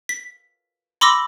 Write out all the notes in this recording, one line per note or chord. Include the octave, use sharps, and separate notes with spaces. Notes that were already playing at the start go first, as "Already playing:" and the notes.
B6
B5 C6 D6 E6 A#6